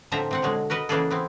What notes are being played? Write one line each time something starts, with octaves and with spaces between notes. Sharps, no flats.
A2 D3 F3 C4 E5 A#5
C3 C4 F#5
B2 D3 F#3 G#3
F#4 A#4 B4 D#5
C#3 E3 A#3 F#4 G#4 A4
B3 C4 E4